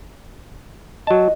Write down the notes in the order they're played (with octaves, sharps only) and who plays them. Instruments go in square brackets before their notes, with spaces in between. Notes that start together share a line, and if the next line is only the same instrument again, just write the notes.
[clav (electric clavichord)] F#3 A5 [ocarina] D#5